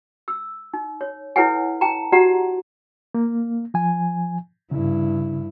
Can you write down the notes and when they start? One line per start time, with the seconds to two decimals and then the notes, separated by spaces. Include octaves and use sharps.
0.28 E6
0.73 D#4
1.01 C#5
1.36 E4 A4 B4 C#5 F#5 G#5
1.81 G5 A5 A#5
2.12 F#4 G4 D5 F#5 A#5
3.14 A#3
3.74 F3 G#5
4.71 G2 C#3 E4